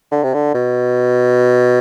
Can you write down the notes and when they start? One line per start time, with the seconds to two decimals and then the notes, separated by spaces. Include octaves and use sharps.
0.11 D3
0.23 C3
0.34 D3
0.54 B2